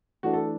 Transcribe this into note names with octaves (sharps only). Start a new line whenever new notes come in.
E3 A3 D4 F#4
A4